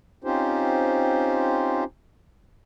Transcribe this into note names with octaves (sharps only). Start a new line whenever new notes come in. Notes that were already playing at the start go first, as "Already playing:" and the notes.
C4 C#4 D#4 F4 G4 C5